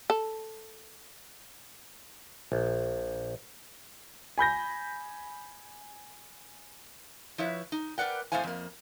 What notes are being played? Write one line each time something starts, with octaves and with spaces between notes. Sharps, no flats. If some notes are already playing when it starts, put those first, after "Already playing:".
A4
A#1
G#5 B5 G6 A#6
F3 E4 B4 C#5
D#4
A#4 B4 D5 F#5 G5
F2 A2 A3 C5 F5 G#5
F2 A#3